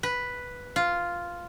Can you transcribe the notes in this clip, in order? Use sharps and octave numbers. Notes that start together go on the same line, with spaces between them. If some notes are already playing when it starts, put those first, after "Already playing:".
B4
F4